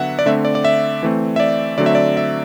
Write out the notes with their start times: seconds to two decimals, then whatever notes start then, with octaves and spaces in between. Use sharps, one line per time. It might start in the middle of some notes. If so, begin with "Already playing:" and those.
Already playing: D3 F#3 B3 E5 F#5
0.19 D5
0.26 D3 A3 C4 E5
0.45 D5
0.55 D5
0.65 E5
1.03 E3 A3 C4
1.36 E5
1.40 D5
1.78 D3 F#3 A3 C4 D5
1.86 E5
1.95 D5
2.17 E5